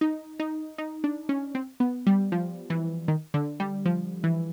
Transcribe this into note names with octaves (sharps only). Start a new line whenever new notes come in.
D#4
D#4
D#4
D4
C#4
C4
B3
G3
F3
E3
D#3
D3
G3
F3
E3